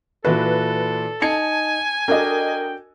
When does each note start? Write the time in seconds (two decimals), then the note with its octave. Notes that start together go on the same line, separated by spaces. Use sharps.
0.25 A#2 E3 F#4 A4 B4
1.22 D#4 G#5 A5 G#6 C#7
2.08 D4 F#4 A4 A#4 D#5 G5